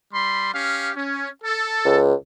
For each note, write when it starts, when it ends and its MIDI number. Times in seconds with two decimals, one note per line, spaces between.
0.13 0.54 55
0.13 0.54 83
0.13 0.54 84
0.54 0.93 61
0.54 0.93 67
0.54 0.93 77
0.95 1.29 61
1.44 1.99 69
1.85 2.14 37